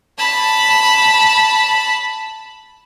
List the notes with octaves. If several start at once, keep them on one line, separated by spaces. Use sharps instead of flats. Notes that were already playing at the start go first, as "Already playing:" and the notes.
A5 B5